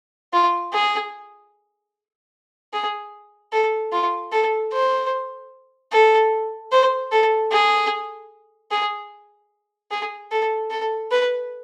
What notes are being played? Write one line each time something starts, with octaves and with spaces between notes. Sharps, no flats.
F4
G#4
G#4
A4
F4
A4
C5
A4
C5
A4
G#4
G#4
G#4
A4
A4
B4